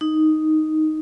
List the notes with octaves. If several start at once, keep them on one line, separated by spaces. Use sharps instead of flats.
D#4